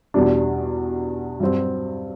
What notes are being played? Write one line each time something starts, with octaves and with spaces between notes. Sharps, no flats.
E2 B2 G3 D4
G2 F#3 C4 F#4